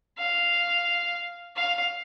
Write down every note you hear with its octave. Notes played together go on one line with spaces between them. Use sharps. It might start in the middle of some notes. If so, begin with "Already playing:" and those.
F5
F5